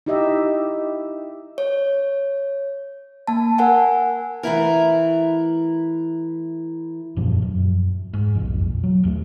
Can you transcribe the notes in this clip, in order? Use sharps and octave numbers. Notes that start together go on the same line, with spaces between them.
D#4 E4 G4 D#5 E5
C#5
A#3 A5
A#4 F#5 G#5
E3 A3 E4 A#4
E1 F#2 A#2 F3
F#2
G#2
F#1 B1 F2
F#3
D#1 F2 F3 A3